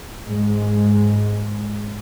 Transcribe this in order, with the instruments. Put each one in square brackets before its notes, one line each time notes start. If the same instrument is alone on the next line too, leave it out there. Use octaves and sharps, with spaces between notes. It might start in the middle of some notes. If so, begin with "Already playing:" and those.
[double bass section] G#2 G#3